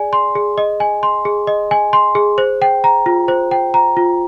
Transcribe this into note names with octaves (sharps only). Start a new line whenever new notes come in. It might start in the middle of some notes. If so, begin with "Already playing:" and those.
Already playing: G#4 D5 G#5
C6
G#4
D#5
G#5
C6
G#4
D#5
G#5
C6
G#4
C5
G5
A#5
F4
C5
G5
A#5
F4